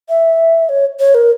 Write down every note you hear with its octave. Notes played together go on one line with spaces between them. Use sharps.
E5
C#5
C#5
A#4